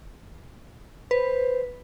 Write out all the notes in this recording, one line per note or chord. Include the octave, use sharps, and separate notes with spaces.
B4 C5